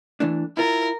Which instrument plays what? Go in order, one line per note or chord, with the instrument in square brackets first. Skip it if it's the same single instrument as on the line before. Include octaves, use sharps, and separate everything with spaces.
[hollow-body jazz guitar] E3 A3 D4
[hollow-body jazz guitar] E4 F4 [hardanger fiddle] A#4